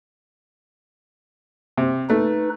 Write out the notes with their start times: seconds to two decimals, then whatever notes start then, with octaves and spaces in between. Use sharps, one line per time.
1.78 C3
2.10 A3 D#4 B4